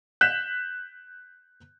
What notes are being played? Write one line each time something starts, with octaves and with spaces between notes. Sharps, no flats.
F#6 G6 B6 E7